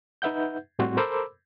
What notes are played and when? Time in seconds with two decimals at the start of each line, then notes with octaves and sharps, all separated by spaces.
0.22 D#4 B4 E5 F#5 G6
0.79 A2 G3 C4 F#4 C5
0.97 A4 A#4 C5 B5 D6 E6